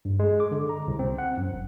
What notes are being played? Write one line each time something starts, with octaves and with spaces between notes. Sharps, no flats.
G2
G#3
D6
D3
A#5
C2
C4
F#5
F#2
G1